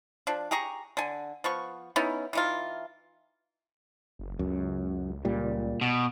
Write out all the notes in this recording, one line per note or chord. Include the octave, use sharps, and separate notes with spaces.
F3 D4
G4 G#4 A#5 C#6
D3 G#5
F3 B3 C#6
B3 C#4 D#4 E4
E3 D#4 F4
F#1
C#2 F#2
A#2 G3
B2